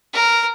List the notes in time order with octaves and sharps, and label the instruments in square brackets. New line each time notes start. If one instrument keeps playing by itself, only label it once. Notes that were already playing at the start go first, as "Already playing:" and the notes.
[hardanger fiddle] A#4